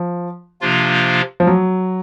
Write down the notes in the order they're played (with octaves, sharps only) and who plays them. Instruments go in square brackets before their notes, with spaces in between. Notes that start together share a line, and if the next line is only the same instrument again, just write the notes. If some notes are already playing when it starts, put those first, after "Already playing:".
Already playing: [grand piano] F3
[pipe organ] C3 F3 A#3 D4 F4
[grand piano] F3
F#3